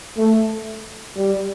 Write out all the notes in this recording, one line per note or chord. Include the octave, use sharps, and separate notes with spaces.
A3
G3